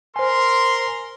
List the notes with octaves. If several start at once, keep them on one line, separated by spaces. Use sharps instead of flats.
A#4 C5 G#5 C6